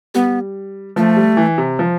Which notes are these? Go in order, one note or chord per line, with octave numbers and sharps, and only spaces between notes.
G3 B3
F3 A3
G3
E3
C3
F3